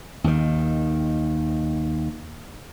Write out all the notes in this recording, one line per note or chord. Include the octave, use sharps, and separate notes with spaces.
D#2 D#3